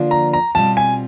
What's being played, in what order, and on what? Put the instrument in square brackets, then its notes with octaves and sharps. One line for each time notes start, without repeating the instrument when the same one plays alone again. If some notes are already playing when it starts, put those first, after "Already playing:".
Already playing: [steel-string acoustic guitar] D3 F3 A#3 D4 F4
[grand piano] A#5
A#5
[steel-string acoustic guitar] B2 G3 C4 F4 [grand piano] A5
[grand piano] G#5